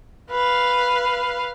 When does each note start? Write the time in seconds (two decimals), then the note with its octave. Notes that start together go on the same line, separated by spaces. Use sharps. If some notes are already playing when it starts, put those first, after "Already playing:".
0.31 B4 F5